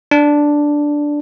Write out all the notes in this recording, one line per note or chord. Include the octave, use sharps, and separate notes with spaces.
D4